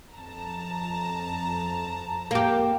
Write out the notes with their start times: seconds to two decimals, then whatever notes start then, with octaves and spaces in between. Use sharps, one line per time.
0.14 F2 A5 A#5
2.31 A#3 G4